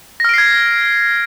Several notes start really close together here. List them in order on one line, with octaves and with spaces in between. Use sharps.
A#6 F6 D7 C7 G#6